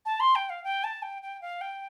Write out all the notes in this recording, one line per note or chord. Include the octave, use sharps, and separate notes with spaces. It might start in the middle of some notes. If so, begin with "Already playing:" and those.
A5
C6
G5
F5
G5
A5
G5
G5
F5
G5